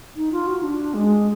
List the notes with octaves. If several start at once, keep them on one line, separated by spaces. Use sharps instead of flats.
D#4
F4
F#4
D4
G#3